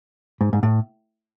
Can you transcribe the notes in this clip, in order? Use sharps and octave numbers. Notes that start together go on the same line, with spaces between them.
G#2
G#2
A2